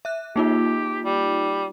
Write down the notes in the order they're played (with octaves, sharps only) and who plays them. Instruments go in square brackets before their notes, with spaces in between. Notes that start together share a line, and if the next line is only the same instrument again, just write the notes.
[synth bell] E5 F#6
[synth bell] A#3 D#4 F4 [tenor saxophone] G4
[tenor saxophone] G3